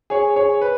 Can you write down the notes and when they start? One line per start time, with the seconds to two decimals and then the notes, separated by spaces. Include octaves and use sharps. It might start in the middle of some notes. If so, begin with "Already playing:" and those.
0.10 G#4 C#5
0.36 G#4 C#5
0.62 B4